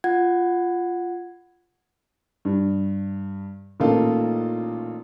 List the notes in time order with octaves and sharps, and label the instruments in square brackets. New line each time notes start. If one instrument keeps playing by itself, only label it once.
[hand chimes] F4 F#5 G#6
[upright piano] G2
A1 A#2 D#3 A#3 F4 A4